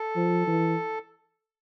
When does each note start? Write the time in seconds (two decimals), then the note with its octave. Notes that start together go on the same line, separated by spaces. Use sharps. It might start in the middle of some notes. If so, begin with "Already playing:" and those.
Already playing: A4
0.16 F3
0.47 E3